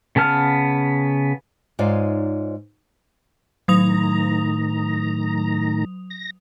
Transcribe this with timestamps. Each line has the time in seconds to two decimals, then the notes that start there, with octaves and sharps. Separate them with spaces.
0.16 C#3 B3 A5 F6
1.79 G#2 D#4 F4 C#5 D5 G#5
3.68 A2 D#3 F#3 A#5 D#6 F7
6.10 A#6